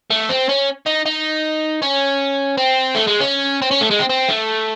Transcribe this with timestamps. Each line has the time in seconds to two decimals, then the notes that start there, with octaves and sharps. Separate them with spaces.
0.11 A3
0.29 C4
0.49 C#4
0.86 D#4
1.05 D#4
1.82 C#4
2.57 C4
2.95 A3
3.08 G#3
3.21 C#4
3.62 C4
3.71 C#4
3.81 A3
3.91 G#3
3.99 C4
4.09 C4
4.28 A3